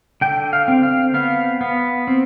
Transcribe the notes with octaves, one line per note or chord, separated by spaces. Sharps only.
D3 G5
F5
C4
F5
B3 F5
B3
C4